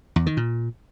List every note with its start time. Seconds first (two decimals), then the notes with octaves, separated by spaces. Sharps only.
0.16 E2
0.26 D#3
0.37 A#2